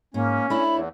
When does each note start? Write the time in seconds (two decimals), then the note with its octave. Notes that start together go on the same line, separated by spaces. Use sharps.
0.14 G#2 A#3 C#4
0.50 A3 D4 E4 C#5 B5
0.72 E2